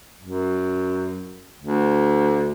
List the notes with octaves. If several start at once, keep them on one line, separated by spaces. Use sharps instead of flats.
F#2
D2